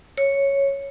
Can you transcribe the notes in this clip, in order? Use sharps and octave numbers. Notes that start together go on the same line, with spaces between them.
C#5